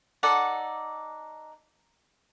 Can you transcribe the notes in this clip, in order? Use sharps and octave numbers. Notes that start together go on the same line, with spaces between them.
D#4 A4 D5 F#5